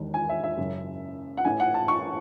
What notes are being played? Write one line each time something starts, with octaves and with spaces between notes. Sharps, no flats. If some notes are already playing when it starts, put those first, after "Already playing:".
Already playing: E1 D#2 D#3
G#5
E5
E5
F#1 F#2 C#3
F#5
A1 A2 E3 G#5
F#5
A5
C#6